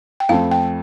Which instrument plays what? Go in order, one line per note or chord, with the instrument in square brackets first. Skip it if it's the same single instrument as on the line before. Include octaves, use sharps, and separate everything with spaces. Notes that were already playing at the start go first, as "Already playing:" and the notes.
[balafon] G5
[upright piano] F2 F3 A3 C4 [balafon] F5
[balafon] G5